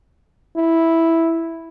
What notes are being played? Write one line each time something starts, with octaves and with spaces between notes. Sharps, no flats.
E4